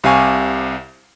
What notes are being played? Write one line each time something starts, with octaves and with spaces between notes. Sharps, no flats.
C2 C3 F5 G#5 C#6